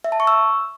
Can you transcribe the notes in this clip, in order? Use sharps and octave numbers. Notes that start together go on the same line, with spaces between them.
E5
A5
C#6
E6